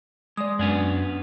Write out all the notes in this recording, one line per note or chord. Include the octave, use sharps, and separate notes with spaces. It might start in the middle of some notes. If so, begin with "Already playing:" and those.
G#3 D5 D#6
F#2 B3 C#4 D4